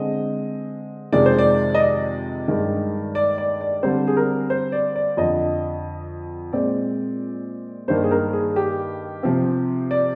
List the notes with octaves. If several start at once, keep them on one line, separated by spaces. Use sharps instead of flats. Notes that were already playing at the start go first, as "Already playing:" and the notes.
Already playing: D3 G#3 C4 D#5
F2 C3 D#3 G#3 D5
C5
D5
D#5
D5
G2 D#3 G#3
D5
D5
D5
D3 G3 C4 C5
G#4
A#4
C5
D5
D5
F2 D3 F3 D#5
A#2 G#3 C4 D5
G2 D#3 A#3 C5
G#4
A#4
G#4
G4
C3 F3 C4
D5